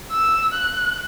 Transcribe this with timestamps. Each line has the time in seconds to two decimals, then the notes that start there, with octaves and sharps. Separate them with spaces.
0.11 E6
0.54 F#6